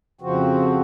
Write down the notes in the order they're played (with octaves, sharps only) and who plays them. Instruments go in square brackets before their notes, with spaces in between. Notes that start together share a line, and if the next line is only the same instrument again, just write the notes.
[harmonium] F2 C#3 F3 C4 F#4